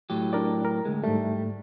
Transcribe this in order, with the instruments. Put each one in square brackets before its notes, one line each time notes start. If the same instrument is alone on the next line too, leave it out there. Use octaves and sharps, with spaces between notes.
[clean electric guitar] A2 F#3 G4
[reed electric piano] D4 A#4 D5
A#4
[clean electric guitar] D2 G#3
[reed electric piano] G#2 A3 [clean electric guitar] G3